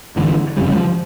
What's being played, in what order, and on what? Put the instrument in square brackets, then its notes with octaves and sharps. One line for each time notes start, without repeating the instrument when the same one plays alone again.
[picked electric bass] G1 G2 D3 E3
G1 F2 C#3 G3
G3
F3